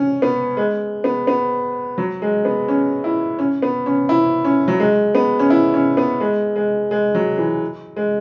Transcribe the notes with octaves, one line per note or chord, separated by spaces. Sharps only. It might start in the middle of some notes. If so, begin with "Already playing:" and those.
Already playing: C#4
B3
G#3
B3
B3
F#3
G#3
B3
C#4
E4
C#4
B3
C#4
E4
C#4
F#3
G#3
B3
C#4
E4
C#4
B3
G#3
G#3
G#3
F#3
E3
G#3